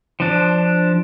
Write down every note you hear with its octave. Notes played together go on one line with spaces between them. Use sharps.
F3 D4